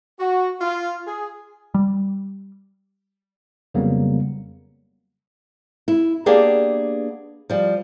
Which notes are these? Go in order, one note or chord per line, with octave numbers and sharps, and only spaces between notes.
F#4
F4
G#4
G3
F2 C#3 F#3 G3 A#3 B3
E4
A#3 B3 D4 G4 G#4 B4
F3 G3